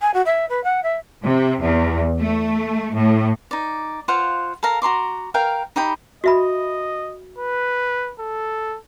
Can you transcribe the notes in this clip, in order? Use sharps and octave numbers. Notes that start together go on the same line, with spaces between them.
G#5
F#4
E5
B4
F#5
E5
C3
E2
A3
A2
D#4 D5
F4 C5 F5 F#5
A4 A#4 F5 A#5
F#4 A#5 C6 D6
A#4 F5 G5
D#4 G4 G5 B5
F#4 D#5 E5 B5
B4
A4